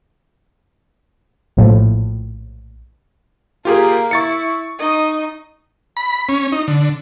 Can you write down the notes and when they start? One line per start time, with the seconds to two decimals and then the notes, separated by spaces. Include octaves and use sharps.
1.57 A#1 A2 F3
3.65 A#3 F4 G4 G#4 A#4
4.11 E4 C#6 A6 C#7
4.79 D#4 D#5
5.97 B5
6.29 C#4
6.52 D#4
6.68 D3